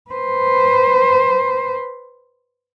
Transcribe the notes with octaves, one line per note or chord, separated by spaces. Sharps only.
B4 C5